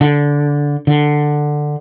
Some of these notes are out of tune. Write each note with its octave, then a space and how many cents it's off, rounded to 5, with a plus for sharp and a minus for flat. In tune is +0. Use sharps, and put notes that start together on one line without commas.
D3 -15
D3 +10